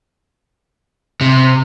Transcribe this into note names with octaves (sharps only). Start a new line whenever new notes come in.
C3